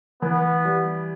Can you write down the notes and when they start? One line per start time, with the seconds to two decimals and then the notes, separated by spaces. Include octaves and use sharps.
0.21 E3 B3
0.65 G3